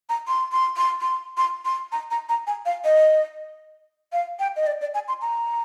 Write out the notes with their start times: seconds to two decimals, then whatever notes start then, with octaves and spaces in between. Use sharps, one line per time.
0.09 A#5
0.28 C6
0.52 C6
0.77 C6
1.01 C6
1.37 C6
1.65 C6
1.92 A#5
2.11 A#5
2.29 A#5
2.47 G#5
2.66 F5
2.84 D#5
4.13 F5
4.39 G5
4.56 D#5
4.67 D5
4.81 D5
4.94 G#5
5.08 C6
5.21 A#5